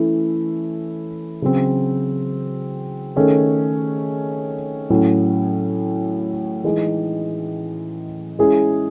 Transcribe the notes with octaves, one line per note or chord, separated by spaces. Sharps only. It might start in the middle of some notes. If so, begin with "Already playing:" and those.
Already playing: E3 A3 C#4 E4
C#3 F#3 C4
D#3 A3 C#4 G#4
A2 F#3 C#4 E4
E3 G#3 D#4 G#4
G#3 C#4 E4 G#4